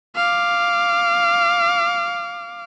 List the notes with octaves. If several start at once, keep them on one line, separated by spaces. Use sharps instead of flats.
F5 D6